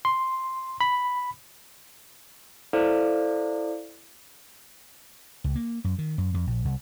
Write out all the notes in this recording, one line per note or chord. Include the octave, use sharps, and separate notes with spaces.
C6
B5
E4 A4 C5 D5 F5
C#2
A#3
F#2
D#3
F#2
F2
A#1
C2